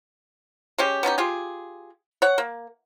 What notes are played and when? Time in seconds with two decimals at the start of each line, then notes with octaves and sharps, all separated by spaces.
0.78 G#3 C#4 G4
1.03 B3 C#4 D#4 G4
1.18 F4 G4 G#4
2.22 C#5 F#5
2.38 A#3